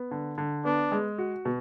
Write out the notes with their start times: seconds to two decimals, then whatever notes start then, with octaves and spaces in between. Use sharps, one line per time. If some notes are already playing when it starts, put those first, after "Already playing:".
Already playing: B3
0.11 D3
0.38 D3
0.65 B3 D4
0.92 G#3
1.18 F#4
1.45 B2